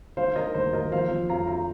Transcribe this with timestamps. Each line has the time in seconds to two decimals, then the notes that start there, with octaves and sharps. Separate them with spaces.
0.17 D#3 C5 F5
0.36 D#3 A#4 D#5
0.55 D#2 C5
0.73 D#2 A#4 D#5
0.92 F3 C5 F5
1.11 F3
1.29 F2 F5 A#5
1.48 F5 A#5